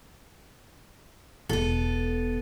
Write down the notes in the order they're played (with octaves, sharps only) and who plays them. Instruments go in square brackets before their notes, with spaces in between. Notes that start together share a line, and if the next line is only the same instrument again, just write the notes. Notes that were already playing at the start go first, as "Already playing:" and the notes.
[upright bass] E1 B2 [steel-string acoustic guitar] B3 A4